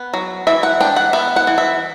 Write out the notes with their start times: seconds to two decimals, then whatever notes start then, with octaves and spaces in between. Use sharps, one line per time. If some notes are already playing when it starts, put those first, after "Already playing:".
Already playing: B3
0.14 F#3
0.47 E3 E5
0.63 F#5
0.80 D4 G5
0.96 F#5
1.13 B3 E5
1.36 F#5
1.47 E3
1.58 E5